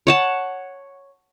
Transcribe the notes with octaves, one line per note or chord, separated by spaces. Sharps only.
C#5 F#5 A5